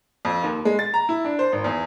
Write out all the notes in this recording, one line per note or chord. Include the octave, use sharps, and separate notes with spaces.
F2
D#2
G#3
A6
A#5
E4
D4
C5
G#1
E2